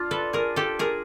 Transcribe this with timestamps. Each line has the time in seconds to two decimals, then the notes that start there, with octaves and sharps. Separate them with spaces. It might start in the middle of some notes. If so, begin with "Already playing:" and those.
Already playing: D4 F4
0.11 A4 B4
0.33 G#4 A#4
0.56 G4 A4
0.79 G#4 A#4